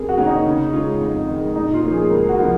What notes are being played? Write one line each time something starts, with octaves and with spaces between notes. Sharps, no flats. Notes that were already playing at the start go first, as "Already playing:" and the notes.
Already playing: F2 G#4 A#4
F#4
C3 D#3 A#3 C#4
D#4
C#3
G#3 C#4 F4
F2
D#3 G#3
A#2 D#4
F4
F3 A#3 C#4
G#4
C#2 A#4
F#4
C3 F3 A#3